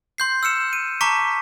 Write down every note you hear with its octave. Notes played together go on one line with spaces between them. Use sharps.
C6 G6 C7
E6 F6 C#7 E7
D#7
A5 A#5 C#6 D6 B6